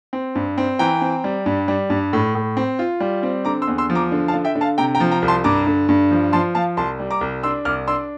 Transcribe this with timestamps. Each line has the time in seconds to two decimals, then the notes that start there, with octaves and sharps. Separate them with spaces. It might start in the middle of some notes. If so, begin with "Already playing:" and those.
0.13 C4
0.35 G2
0.58 C4
0.79 E3 G5 A#5
1.01 C4
1.24 G3
1.46 G2
1.68 G3
1.90 G2
2.13 A2
2.35 A2
2.57 C4
2.79 F4
3.01 G3
3.23 C4
3.45 D3 A#5 D6
3.62 C6 E6
3.67 E2
3.78 C6 E6
3.90 F3
3.95 A#5 D6
4.12 D3
4.28 F5 A5
4.34 D3
4.45 E5 G5
4.55 D3
4.61 F5 A5
4.78 C3 G5 A#5
4.95 G5 A#5
5.00 F3
5.11 G5 A#5
5.22 C2
5.28 A5 C6
5.44 G2 A#5 D6
5.67 D3
5.89 G2
6.11 F3
6.33 F3 A5 C6
6.55 F3 F5 A5
6.77 C2 A5 C6
6.99 G3
7.11 A#5 D6
7.21 C2
7.43 D4 C6 E6
7.65 C2 D6 F6
7.88 D4 C6 E6